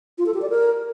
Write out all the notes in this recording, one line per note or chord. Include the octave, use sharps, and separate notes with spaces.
F4
A4
G4
D5
A#4